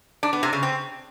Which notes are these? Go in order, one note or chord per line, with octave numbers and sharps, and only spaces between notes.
D4
B3
C3
C#3
C4